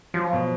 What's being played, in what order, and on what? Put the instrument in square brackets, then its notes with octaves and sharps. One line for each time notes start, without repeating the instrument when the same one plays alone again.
[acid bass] F3 [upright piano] F#3
[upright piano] B2